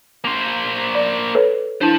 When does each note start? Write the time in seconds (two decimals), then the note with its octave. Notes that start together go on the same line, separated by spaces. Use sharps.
0.25 A#3 C5
0.95 D5
1.35 A4 B4 C#5
1.81 D4 E4 C5 A5